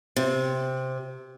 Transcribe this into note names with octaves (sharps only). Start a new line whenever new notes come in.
C3